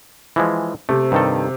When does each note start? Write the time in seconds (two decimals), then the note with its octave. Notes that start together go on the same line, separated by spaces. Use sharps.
0.36 E3 F3 G#3
0.89 C3 A3 C4
1.12 G2 D#3 A4